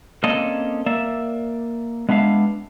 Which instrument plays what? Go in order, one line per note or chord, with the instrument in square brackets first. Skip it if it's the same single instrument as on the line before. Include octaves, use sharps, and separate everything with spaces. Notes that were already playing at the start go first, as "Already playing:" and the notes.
[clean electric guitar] A#3 C4 C#4 A4 D5 D#5
A#3 D5 E5
G#3 B3 D4 E5 F5